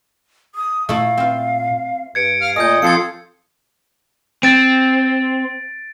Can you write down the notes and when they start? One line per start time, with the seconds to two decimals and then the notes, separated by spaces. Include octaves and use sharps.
0.55 D#6
0.89 A#2 A3 E4 F5
1.17 C4 F4
2.15 G2 G#6 C#7 D7
2.41 F5 F6
2.56 A#2 A3 D#5 G#5 D#6 G6
2.82 F3 C4 F4 A4 G#6 C7 C#7
4.43 C4 A6 D7